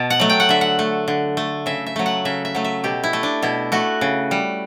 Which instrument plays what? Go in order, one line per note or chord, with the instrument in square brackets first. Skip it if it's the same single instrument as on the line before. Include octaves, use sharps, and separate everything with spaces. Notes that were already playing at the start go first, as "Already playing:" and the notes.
Already playing: [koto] B2 A5
F#5
F#3 A3
G5
F#5
D3 E5
F#5
A3
D3
A3
C#3 E5
E5
F#3 A3
F#5
C#3 E5
E5
F#3 A3
E5
B2 G4
E4
A3
D4
B2 E4
A3 F#4
C#3
G3